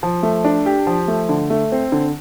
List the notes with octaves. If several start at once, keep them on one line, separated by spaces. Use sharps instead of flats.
F3
A3
D4
G4
F3
A3
D3
A3
C4
D3